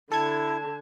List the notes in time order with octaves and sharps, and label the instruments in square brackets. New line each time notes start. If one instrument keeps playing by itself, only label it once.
[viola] D3 [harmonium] E4 [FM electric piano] A4 G#6 [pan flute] A5